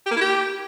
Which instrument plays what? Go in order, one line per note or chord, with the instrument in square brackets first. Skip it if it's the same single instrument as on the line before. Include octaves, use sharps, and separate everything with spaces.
[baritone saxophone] G4
A#3
E4
G4